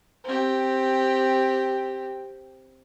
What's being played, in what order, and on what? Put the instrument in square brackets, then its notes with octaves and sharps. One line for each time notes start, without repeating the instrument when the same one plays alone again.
[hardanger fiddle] C4 G4